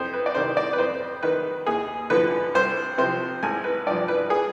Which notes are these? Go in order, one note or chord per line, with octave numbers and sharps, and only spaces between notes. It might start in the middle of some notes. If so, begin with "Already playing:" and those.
Already playing: F2 C5
B4
D5
C3 D#3 C5
D5
B4
F2 C5
D#3 B4
D#2 G#4
D3 F3 B4
C2 C5
C3 F3 C5
G#1 G#5
B4
G2 F3 D5
B4
G#4